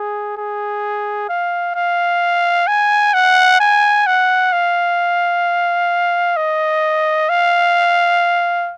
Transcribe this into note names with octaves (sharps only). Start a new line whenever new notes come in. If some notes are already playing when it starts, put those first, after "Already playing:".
Already playing: G#4
G#4
F5
F5
G#5
F#5
G#5
F#5
F5
D#5
F5